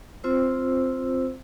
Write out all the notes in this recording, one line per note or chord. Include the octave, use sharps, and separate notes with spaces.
C4 F4 C5 E6